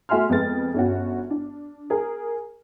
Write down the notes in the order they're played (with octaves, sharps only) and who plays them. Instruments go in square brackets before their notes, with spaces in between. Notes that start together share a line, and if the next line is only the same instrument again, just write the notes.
[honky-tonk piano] A3 F#4 E5 G#5 C6 F6
F2 G#3 B3 A6
G1 C#4 F#4
D4
G#4 A#4